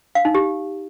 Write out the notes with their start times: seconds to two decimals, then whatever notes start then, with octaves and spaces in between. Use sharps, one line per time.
0.15 F5
0.25 D#4
0.35 G4